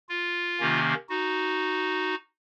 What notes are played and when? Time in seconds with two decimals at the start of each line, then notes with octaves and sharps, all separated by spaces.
0.09 F4
0.60 C3 D#3 A#3 C#4
1.09 D#4 F#4